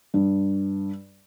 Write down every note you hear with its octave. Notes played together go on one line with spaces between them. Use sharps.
G2